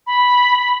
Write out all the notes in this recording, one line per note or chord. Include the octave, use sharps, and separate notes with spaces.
B5